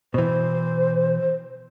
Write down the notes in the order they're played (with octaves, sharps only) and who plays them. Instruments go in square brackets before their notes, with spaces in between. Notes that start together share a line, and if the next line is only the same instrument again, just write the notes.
[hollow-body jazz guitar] B2 E3 [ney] C5